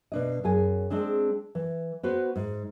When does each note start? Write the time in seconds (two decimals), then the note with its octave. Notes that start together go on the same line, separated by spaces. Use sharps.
0.12 B2 D4 D#5
0.44 F#2 G#4 G#5
0.90 G#3 C4 D4 G#4
1.55 E3
2.03 B3 F#4 B4 C5
2.36 G#2